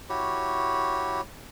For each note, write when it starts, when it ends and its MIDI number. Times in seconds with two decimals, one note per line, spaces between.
0.09 1.21 64
0.09 1.21 66
0.09 1.21 67
0.09 1.21 73